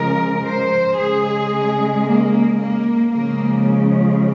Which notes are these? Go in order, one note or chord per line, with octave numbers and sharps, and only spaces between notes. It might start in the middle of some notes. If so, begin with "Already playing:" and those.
Already playing: C#3 F3 G#3 A#4
C5
C#3 G#3 G#4
A#3
A#3
C#3 F3 G#3 A#3